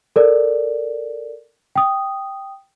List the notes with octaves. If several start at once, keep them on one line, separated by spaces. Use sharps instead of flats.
A4 A#4 D5
G5 D#6